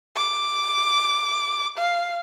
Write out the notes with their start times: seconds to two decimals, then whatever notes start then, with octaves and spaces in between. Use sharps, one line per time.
0.16 D6
1.78 F5